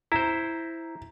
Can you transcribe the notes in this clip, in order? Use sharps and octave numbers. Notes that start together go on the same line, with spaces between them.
E4 C5 A#5